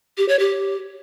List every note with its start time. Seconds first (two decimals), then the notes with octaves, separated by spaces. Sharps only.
0.18 G4
0.29 C#5
0.39 G4